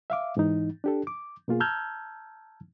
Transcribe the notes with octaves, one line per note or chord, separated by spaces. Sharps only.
E5 F5 D6
G#2 E3 D#4
D4 G4 A4
D6
B2 A#3 F4 G#4
A5 A#5 E6 F6 G6 G#6